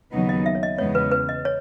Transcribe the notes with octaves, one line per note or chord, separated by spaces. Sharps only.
D#2 C#3 F#3 B3 D#4
D#5
E5
C#5
D#5
E2 C#3 G#3 B3 C#5
B4
B4
D#5
C#5